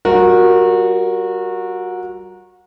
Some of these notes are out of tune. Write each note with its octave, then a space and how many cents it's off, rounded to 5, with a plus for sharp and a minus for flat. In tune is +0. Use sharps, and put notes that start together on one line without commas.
G3 -45 F#4 -25 A#4 +0